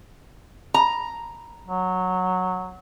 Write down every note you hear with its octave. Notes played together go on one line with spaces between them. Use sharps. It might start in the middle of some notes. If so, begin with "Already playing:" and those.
A#5
F#3